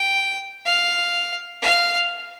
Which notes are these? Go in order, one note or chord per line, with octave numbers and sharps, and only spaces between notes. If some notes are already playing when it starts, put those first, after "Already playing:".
Already playing: G5
F5
F5